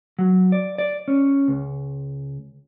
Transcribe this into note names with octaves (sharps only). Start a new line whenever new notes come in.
F#3
D5
D5
C#4
C#2